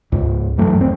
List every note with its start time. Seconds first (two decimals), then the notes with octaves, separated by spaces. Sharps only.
0.12 C#2 G#2
0.58 G2 E3 F#3 A3
0.78 D#1 C4